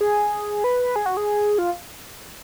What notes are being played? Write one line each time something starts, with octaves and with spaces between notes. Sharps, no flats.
G#4
B4
G#4
F#4
G#4
F4